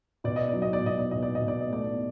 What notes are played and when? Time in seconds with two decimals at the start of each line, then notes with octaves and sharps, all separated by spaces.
0.24 B2 D5
0.36 D#5
0.49 F#3 D5
0.62 D#5
0.73 D5
0.83 B2 D#5
0.99 D5
1.11 B2 D#5
1.22 D5
1.35 D#5
1.41 B2
1.48 D5
1.61 D#5
1.70 A3 D5